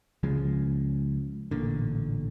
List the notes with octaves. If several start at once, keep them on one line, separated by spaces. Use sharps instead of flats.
C#2 C#3 F3 G#3
A1 A#2 D3